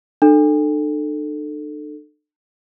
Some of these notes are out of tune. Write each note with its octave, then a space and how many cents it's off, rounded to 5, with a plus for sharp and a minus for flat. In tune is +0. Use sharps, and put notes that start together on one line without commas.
D4 +45 A4 +0